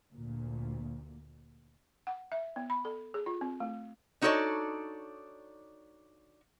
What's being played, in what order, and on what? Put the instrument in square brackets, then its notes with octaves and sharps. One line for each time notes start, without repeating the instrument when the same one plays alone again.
[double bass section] D2 A#2
[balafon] F#5
E5
B3
B5
A4
G#4
F4
C4
A3
[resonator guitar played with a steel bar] D4 D#4 F#4 A4 C#5 D5